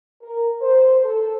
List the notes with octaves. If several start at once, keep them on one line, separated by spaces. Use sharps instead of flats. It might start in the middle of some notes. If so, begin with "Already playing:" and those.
A#4
C5
A4